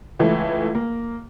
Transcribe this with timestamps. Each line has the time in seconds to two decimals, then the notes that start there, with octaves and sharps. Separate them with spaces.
0.19 C#2 E3 A3
0.75 A#3